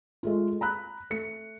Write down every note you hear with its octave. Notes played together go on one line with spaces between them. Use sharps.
G#3 A3 F4
A#5 B5 F#6
A3 C#7